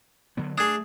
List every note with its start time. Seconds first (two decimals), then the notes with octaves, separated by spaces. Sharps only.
0.37 D3 F#3 B3
0.58 A3 D4 G#4 D#6 G#6